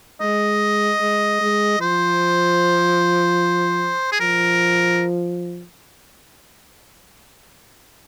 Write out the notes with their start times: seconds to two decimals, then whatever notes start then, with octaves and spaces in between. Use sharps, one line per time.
0.21 G#3 D#5
1.01 G#3
1.41 G#3
1.80 F3 C5
4.12 G#4
4.20 F3 A#4